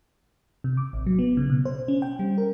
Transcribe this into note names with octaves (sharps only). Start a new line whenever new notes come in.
C3
D6
A1
F#3
B3
C#3
B2
C5
C#4
G5
G3
A#4